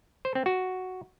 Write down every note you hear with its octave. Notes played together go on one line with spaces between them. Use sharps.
C5
C4
F#4